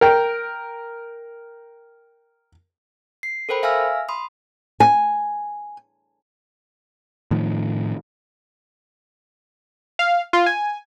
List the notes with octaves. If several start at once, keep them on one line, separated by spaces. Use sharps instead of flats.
A#4 G5
C7
A4 A#4 C5 G5 B5
E5 F5 G#5 E6 F6 A#6
B5 C6 D#6
G#5
A2 D#3 F3
F5
F4
G#5